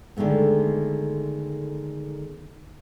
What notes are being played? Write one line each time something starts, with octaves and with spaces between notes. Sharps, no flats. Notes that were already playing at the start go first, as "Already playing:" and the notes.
D3 D#3 G#3 A3 B3